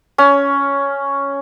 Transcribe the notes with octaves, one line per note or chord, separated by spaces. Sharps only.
C#4